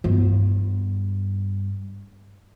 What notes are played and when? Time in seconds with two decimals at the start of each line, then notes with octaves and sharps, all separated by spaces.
0.04 G2 B3